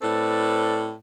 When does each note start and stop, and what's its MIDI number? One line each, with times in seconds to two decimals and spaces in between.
0.02 0.92 45
0.02 0.92 60
0.02 0.92 69
0.02 0.92 71
0.02 0.92 74